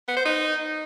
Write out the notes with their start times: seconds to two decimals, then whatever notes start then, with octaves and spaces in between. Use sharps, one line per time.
0.08 B3
0.17 C5
0.25 D#4